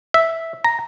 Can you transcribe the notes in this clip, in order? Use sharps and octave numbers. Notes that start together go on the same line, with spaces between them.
E5
A#5